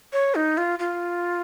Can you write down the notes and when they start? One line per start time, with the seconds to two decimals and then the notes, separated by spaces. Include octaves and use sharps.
0.13 C#5
0.35 D#4
0.58 F4
0.79 F4